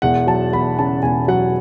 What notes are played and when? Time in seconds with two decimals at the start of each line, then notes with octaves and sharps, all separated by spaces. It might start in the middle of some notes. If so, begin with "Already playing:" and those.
0.02 E1 F#5
0.27 F#3 A5
0.53 E2 B5
0.79 C#3 A5
1.03 E1 G#5
1.28 F#3 F#5